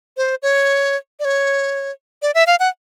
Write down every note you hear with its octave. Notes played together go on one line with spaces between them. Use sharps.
C5
C#5
D5
C#5
D5
E5
F5
F#5